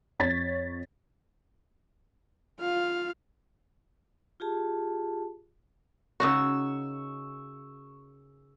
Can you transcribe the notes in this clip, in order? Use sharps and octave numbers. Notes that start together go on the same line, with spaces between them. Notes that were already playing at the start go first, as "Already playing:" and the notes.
F2 C#5 G#6 A6 B6
F4 F5
F4 G4 G#4 A5
C#3 D#4 F#4 C#6 E6